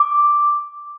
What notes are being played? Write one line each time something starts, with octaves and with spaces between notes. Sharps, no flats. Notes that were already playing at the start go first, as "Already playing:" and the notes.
Already playing: D6